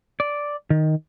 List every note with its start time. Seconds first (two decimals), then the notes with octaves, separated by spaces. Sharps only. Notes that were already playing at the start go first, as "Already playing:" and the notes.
0.20 D5
0.70 D#3